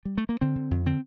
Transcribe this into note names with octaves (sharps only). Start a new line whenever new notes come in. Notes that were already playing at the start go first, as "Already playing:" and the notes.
G3
A3
A#3
D3 C4
D3
F2
D3 C4